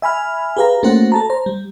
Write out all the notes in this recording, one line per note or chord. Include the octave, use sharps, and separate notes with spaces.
E5 G#5 B5 F6
G4 G#4 B4 F5 A#5
A3 A#3 C#4 F#4 C5 F#5
A4 A5 A#5
C5 A#5
G3